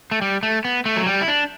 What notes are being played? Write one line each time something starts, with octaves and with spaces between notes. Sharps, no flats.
A3
G3
A3
B3
A3
F#3
G3
E4
D4